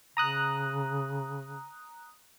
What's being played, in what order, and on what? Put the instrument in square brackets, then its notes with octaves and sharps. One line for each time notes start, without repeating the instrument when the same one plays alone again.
[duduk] C#3 [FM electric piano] A#5 D#6 F#6